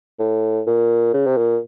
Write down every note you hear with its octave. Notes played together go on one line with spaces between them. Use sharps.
A2
A#2
C#3
C3
A#2